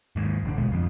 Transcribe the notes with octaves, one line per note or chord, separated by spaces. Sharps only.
D#2 G#2
F#1 D3 D4
A#1 B2 G#3
F2 F3